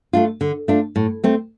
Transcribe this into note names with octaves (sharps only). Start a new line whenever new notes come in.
A3 D4 F4
D3
A3 D4 F4
A2
A3 C4